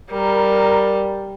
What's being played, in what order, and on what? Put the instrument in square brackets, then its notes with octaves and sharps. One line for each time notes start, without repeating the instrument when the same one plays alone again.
[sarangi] G3 [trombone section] A#4